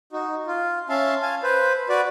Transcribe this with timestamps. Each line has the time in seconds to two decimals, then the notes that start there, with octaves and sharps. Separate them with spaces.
0.13 D#4 F#4
0.47 F4
0.89 C#4 E5 F5 A5 C6
1.22 F5 G#5 A5
1.43 B4 C5
1.89 F#4 B4 D5